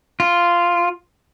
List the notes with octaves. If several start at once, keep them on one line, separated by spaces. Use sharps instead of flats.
F4